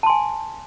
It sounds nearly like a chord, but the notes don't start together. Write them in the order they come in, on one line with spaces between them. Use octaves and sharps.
A5 C6 G#5